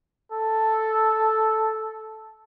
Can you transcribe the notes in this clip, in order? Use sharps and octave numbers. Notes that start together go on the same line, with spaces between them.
A4